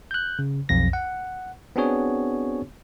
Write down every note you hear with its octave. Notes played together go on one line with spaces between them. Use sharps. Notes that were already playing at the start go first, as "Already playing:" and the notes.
F#6 G6
C#3
B1 F2 A#6
F#5
B3 C4 D4 F#4 G#4 C#5